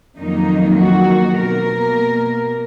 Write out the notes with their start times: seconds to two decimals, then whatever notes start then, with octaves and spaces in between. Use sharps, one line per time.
0.18 F2 D#3 F#3 A#3 D#4
0.78 F#4
1.37 B2 A#3 A#4